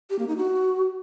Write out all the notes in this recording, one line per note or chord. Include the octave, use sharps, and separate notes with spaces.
G4
A#3
D#4
F#4